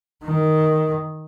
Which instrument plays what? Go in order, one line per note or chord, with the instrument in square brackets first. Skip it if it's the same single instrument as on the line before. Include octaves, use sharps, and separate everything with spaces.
[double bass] D#3